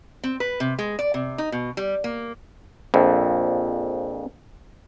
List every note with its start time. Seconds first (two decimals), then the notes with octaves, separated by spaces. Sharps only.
0.23 C4
0.40 B4
0.60 C3
0.79 G#3
0.99 D5
1.14 C3
1.38 D#4
1.52 B2
1.77 G3
2.04 A#3
2.94 A#1 F2